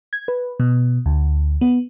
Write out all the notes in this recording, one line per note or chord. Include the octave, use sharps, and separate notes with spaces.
G#6
B4
B2
D2
B3